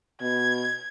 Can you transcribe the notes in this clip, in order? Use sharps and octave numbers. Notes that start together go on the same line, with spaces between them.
B2 G#6